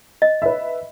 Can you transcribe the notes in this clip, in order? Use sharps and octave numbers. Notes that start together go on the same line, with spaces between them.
D#5
B4 E5